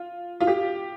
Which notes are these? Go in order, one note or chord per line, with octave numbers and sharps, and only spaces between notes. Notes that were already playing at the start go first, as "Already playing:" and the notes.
Already playing: F4
F4
G4